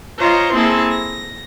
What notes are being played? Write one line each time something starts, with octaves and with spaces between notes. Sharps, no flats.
F4 C5 C#5 D#5 A#5 C6
A#3 C4 E4 G#4 A4
A#6